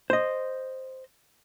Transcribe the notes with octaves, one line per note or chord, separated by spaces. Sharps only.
C5 D#5